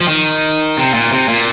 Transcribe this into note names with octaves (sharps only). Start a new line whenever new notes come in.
F3
D#3
C3
A#2
C3
A#2